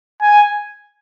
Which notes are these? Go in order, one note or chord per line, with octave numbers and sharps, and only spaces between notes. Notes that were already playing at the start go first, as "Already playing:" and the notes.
G#5